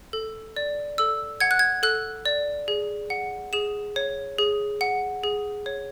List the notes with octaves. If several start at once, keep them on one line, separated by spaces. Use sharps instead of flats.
A4
D5
A4 E6
F#5 G#6
F#6
G#6
A4 F#6
D5
G#4
F#5
G#4 E7
C#5
G#4
F#5
G#4
C#5